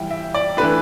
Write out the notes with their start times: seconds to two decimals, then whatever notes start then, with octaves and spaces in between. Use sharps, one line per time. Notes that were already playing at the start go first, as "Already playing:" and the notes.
Already playing: E3 G3 E4 G5
0.10 E5
0.34 D5
0.57 E3 A3 D4 B4